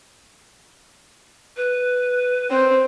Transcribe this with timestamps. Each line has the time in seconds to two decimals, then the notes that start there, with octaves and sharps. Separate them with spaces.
1.57 B4
2.50 C4 C5